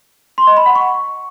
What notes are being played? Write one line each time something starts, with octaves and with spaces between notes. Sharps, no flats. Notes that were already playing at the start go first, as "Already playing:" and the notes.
C6
D#5
B5
F#5
C#6